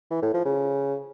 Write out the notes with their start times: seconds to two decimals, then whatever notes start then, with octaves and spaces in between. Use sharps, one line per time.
0.11 E3
0.22 A2
0.34 F3
0.45 C#3